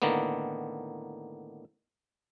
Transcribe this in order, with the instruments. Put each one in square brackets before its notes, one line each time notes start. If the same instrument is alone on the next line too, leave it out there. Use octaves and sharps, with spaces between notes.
[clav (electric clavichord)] A2 D3 D#3 A#3 B3